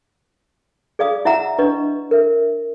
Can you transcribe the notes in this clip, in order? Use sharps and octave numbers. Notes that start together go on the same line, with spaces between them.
G#4 D5 F5 D#6
E4 E5 F#5 A#5 E6
D4 B4 D#5 C#6
A#4 E5